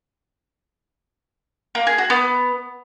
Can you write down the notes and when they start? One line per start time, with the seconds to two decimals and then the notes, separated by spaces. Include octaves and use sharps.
1.75 A#3
1.87 G#4
1.98 F#4
2.10 B3